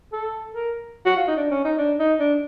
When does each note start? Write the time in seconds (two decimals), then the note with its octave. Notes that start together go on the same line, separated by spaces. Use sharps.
0.12 A4
0.55 A#4
1.06 F#4
1.16 F4
1.27 D#4
1.37 D4
1.51 C#4
1.65 D#4
1.78 D4
1.99 D#4
2.20 D4